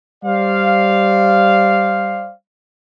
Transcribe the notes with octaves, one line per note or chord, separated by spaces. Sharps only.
G3 C5 D5 F5